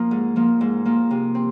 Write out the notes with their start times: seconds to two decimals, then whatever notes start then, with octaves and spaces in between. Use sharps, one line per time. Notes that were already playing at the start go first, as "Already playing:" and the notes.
Already playing: F3 A#3
0.11 G#2
0.36 F3 A#3
0.61 G#2
0.85 F3 A#3
1.11 C3
1.35 C4